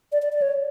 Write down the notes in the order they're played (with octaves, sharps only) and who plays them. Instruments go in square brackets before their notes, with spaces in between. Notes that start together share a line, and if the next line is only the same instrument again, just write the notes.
[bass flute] D5
D5
D5
C#5